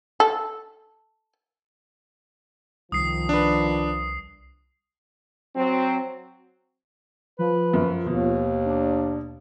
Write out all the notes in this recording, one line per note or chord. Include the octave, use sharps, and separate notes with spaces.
A4
C2 D#3 F3 D#6 C7
D4 B4
F#3 C4
F3 B4
F#2
D#2 B2
D4